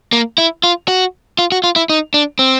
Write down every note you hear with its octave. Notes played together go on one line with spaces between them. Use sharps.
A#3
E4
F4
F#4
F4
F#4
F4
E4
D#4
D4
C4